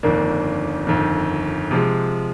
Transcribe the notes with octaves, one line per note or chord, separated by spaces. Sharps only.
G1 F2 D#3 A#3 D4
G1 F2 D#3
C3 F3 G#3